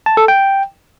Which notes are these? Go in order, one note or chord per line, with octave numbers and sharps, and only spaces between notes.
A5
A4
G5